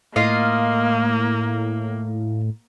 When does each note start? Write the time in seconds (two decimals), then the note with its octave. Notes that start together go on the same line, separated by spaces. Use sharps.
0.16 A2 A#3 F4 D#5 F5